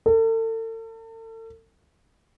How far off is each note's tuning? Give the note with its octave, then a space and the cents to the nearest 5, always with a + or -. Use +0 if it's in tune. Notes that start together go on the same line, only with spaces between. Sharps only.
A4 +40